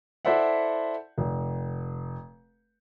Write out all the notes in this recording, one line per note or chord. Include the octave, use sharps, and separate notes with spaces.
E4 A4 C5 D5 E5 F#5
F1